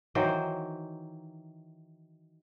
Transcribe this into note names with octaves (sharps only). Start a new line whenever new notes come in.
D#3 E3 F#3 C5